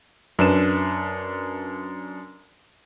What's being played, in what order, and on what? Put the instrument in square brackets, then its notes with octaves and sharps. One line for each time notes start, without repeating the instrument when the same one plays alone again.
[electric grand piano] F#2 D4 B4 E7